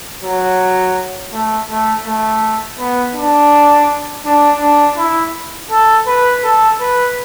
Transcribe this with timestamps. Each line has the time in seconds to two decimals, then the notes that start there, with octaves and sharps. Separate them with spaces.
0.24 F#3
1.33 A3
1.69 A3
2.06 A3
2.79 B3
3.15 D4
4.25 D4
4.61 D4
4.97 E4
5.71 A4
6.07 B4
6.44 A4
6.80 B4